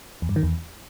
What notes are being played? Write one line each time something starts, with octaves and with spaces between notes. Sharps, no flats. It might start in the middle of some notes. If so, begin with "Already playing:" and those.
E2
G2
D#3
E2